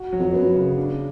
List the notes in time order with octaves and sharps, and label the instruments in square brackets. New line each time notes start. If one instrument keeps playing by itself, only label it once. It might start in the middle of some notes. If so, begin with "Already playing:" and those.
Already playing: [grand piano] F#4
F#3
[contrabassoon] F2
[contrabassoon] F#2 [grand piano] B3
[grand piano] C#3
D4